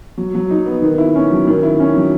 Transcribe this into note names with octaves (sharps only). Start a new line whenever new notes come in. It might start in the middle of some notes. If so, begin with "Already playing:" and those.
F#3
F#3
D#4
B3
D#3
E4
C#4
F#3
D#3
E4
C#4
F#3